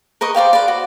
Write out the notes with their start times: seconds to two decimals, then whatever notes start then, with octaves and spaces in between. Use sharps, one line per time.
0.21 A#4 B4 D#5 C#6
0.35 C5 D5 F5 G5
0.53 B4 D5
0.68 F#4